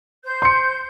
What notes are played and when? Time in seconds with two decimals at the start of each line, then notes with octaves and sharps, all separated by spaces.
0.24 C5 G6
0.42 C6 C#7